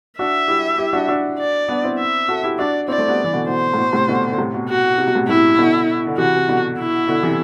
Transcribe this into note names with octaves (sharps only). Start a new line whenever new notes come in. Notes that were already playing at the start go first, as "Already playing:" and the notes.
D4 F#4 E5
E4 G4
E4 G4
D4 F#4
D4 F#4
D5
B3 D4
C4 E4
E5
F#4 A4
E4 G4
D4 F#4 D5
C4 E4 D5
A3 C4
G3 B3
E3
B2 D3
B2 C5
A2
B2
A2 C3
B2 D3
D3
A2 C3
B2
F#4
C3
B2
A2 C3
A2 C3 E4
B2 D3
D3
C3 E3 F#4
C3
B2 D3
E4
B2 D3
C3 E3